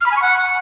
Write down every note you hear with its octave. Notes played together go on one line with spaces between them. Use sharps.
F6
B5
G#5
C#6
F#5